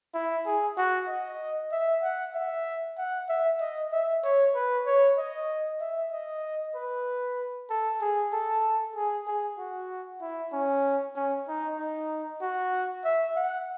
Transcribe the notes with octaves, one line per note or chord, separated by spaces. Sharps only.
E4
G#4
F#4
D#5
E5
F#5
E5
F#5
E5
D#5
E5
C#5
B4
C#5
D#5
E5
D#5
B4
A4
G#4
A4
G#4
G#4
F#4
E4
C#4
C#4
D#4
D#4
F#4
E5
F#5